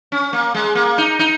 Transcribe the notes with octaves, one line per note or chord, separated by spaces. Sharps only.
C#4
A#3
G#3
A#3
D#4
D#4